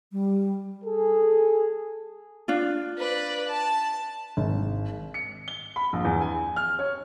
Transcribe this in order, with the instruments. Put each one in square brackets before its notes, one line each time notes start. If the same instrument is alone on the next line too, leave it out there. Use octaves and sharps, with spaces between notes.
[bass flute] G3
[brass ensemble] G#4 A4
[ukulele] D4 F4
[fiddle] B4 D5
A5
[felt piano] G#1
[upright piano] C#7
G7
B5
A#1
E2
G#5
F6
C#5